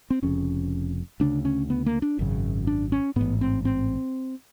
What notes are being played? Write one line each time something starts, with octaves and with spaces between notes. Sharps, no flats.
C4
F1 F2 C#3 C#4
D2 C#3 D4
C#4
B3
A#3
D4
G#1 F#2 C#3
D4
C#4
A1 G#2 B3
C4
C4